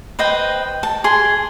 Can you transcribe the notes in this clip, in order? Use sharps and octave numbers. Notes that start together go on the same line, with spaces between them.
B4 C5 D#5 G5
A5
G#4 C6